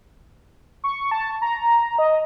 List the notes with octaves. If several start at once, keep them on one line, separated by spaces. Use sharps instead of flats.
C#6
A5
A#5
D#5